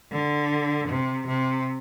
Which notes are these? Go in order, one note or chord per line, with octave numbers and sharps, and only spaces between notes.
D3
C3
C3